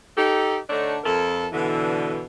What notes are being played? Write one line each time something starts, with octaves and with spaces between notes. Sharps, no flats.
D#4 G4 A4
D3 A3 D4 D#4 C#5 D5
F2 A4 A#4
B2 D3 E3